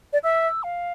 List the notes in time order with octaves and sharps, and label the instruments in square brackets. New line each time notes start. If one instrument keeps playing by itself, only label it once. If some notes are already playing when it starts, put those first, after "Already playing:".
[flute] D5
[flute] E5 [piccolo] E6
[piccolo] F5